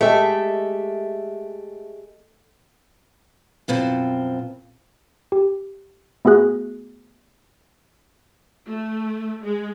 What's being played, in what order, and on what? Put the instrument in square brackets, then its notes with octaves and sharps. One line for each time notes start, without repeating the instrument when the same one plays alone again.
[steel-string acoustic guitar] G#3 G4 E5 [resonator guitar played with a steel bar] A3
[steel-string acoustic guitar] F#2 B2 F3 C4
[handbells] G4
A3 B3 F#4 G#4 F#6
[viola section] A3
G#3